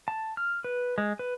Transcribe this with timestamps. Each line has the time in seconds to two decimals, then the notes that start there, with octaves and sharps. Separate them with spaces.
0.08 A5
0.37 F6
0.64 B4
0.98 G#3
1.19 B4